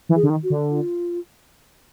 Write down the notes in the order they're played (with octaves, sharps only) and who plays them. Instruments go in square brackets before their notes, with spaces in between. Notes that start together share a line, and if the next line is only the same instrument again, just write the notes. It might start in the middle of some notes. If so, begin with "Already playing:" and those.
[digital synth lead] E3
[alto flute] G#4
[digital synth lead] D3
D#3
[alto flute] F#4
[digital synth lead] D3
[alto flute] F4